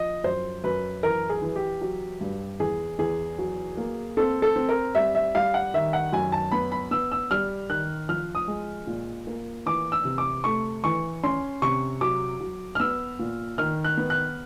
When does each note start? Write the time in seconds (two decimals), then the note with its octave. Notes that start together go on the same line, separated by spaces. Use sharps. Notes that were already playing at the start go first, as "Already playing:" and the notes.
Already playing: F3 D#5
0.24 F#2 C5
0.64 F#2 B4
1.03 E3 A#4
1.29 G#4
1.42 E3
1.56 G4
1.81 F#3
2.21 G2
2.60 E2 G#4
2.98 E2 G#4
3.39 F#3
3.77 A#3
4.17 C4 A4
4.42 A4
4.56 C4
4.69 A#4
4.95 G3 E5
5.15 E5
5.35 G3 F5
5.54 F#5
5.74 D#3 E5
5.93 F#5
6.13 F#2 G#5
6.32 A5
6.52 B3 B5
6.72 B5
6.91 B3 E6
7.12 E6
7.31 G3 F6
7.69 D#3 F#6
8.09 F3 F6
8.35 D#6
8.48 G#3
8.87 A#2
9.27 A#3
9.66 E3 D6
9.92 E6
10.05 C3
10.18 D6
10.44 A3 C#6
10.84 E3 C#6
11.23 C#4 C6
11.62 C3 C#6
12.01 F#3 D6
12.41 F#3
12.75 F6
12.80 B3 E6
13.19 A#2
13.58 D#3 F6
13.84 F#6
13.97 B3
14.10 F#6